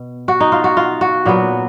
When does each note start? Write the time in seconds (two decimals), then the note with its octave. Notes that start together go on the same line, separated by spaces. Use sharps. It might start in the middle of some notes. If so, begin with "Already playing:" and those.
Already playing: B2
0.28 F#4
0.40 D#4
0.52 F4
0.64 F#4
0.77 F4
1.01 F#4
1.26 A#2 F#3 B3